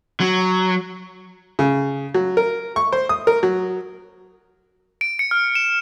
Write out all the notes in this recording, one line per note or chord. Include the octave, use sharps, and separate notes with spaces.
F#3
C#3
F#3
A#4
C#6
C5
D#6
A#4
F#3
D7
C#7
F6
E7